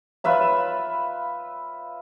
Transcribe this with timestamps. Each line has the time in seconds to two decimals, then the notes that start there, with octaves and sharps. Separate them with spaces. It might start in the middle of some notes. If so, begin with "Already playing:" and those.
0.24 F4 B4 E5 B5